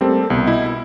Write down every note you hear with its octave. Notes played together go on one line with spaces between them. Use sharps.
G3 A3 A#3 C4 G4 A4
C2 B2
E4 D#5
E4